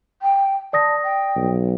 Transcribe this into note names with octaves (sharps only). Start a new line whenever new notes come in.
G5
D5 A5 D#6 A#6
G5
B1